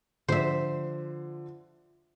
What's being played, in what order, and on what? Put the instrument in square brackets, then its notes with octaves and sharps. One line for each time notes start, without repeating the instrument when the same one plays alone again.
[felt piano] D3 F3 [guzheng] C5 E5